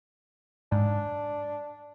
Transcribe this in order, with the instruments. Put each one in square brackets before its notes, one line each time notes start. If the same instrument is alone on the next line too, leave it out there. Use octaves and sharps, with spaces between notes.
[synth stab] G#2 [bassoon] D4